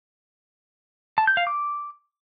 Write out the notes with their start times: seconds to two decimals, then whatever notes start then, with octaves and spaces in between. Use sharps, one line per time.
1.18 A5
1.27 G6
1.37 F5
1.47 D6